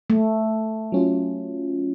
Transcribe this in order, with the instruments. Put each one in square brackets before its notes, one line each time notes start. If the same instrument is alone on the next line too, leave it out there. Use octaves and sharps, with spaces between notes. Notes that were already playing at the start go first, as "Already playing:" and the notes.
[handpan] A3
[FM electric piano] F#3 C#4 F4